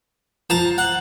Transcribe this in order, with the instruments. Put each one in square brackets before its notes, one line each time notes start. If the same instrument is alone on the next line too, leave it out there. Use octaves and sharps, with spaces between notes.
[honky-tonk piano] F3 [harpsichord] A5 A#5
[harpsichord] F#5